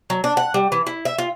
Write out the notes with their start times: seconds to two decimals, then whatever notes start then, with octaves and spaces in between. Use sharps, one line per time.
0.10 F#3
0.24 D4
0.37 F#5
0.54 G3
0.72 E3
0.87 E4
1.05 E5
1.18 F4